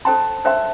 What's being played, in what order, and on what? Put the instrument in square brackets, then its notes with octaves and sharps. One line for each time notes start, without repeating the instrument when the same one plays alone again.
[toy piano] A4 C5 G5 C6 [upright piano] A5
[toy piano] A4 C5 G5 C6 [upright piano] E5